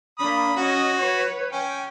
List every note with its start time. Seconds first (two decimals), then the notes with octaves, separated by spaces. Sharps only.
0.19 A#3 D4 B5 D#6
0.57 C#4 F#4 D#5
0.97 B4 C#5
1.52 C#4 G5